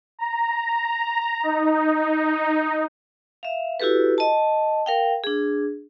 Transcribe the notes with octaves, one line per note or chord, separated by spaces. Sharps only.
A#5
D#4
E5 F5
E4 F#4 G4 A4 B4
D#5 A5
A#4 F5 G5
D4 G#4